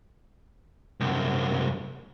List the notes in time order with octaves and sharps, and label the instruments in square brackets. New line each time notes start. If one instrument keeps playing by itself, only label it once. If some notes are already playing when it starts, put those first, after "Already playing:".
[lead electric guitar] C2 F#2